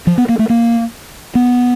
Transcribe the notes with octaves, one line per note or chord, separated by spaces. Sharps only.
F3
B3
A#3
A3
A#3
B3